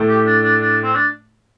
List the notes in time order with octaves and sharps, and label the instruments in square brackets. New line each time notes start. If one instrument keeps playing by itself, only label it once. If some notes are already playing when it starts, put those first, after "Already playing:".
Already playing: [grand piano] A2 A3
[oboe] G4
D4
D4
D4
C4
D4